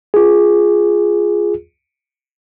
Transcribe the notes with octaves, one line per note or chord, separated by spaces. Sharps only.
F4 G#4